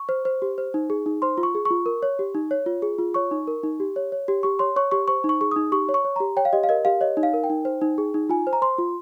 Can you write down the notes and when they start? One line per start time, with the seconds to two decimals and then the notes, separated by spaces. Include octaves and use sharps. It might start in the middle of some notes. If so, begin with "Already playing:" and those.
Already playing: C#6
0.09 C5
0.25 C5
0.42 G4
0.58 C5
0.74 D#4
0.90 G#4
1.06 D#4
1.22 C5 C6
1.38 F4
1.43 C#6
1.55 G#4
1.65 F4 C#6
1.86 A#4
2.03 C#5
2.19 G4
2.35 D#4
2.51 C#5
2.66 F4
2.82 G#4
2.98 F4
3.14 C#5 C#6
3.31 D#4
3.47 A#4
3.63 D#4
3.80 G4
3.96 C#5
4.12 C#5
4.28 G4
4.43 G4 C#6
4.59 C#5 C6
4.76 C#5 C#6
4.91 G4 C#6
5.08 C5 C#6
5.24 D#4
5.29 C#6
5.41 G#4 C#6
5.51 D#4 D#6
5.72 G4 C#6
5.89 C#5
5.94 C#6
6.04 C#5
6.16 G4 A#5
6.37 C#5 G5
6.45 F5
6.53 G4 D#5
6.64 F5
6.69 A#4 D#5
6.85 G4 F5
7.01 C#5 D#5
7.17 D#4
7.23 F5
7.34 A#4
7.44 G5
7.50 D#4
7.65 C5
7.81 D#4
7.98 G#4
8.14 D#4
8.29 F4 G#5
8.47 C5
8.53 A#5
8.62 C5 C6
8.78 F4